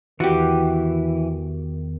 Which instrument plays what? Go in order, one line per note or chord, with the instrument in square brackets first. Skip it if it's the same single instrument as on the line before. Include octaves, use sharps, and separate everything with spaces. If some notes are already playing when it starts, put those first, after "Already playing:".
[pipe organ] E2 D#3 [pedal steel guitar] E3 [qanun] F#4 G4